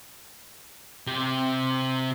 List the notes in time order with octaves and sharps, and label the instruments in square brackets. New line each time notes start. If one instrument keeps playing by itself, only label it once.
[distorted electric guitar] C3 G4